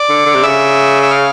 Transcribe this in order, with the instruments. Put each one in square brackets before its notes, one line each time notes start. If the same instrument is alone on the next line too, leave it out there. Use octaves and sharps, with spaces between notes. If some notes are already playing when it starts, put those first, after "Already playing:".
Already playing: [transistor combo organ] D5
[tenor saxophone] D3
D3
C3
[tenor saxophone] C#3 [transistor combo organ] E5
[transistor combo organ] E5
F5